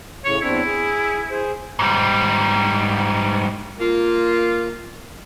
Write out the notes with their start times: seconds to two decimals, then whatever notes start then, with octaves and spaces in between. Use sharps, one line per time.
0.25 A2 C#3 C#5
0.41 E2 C4 D4 E4
0.66 G#4
1.30 G#4 C5
1.79 G#2 G3
3.79 A#3 F4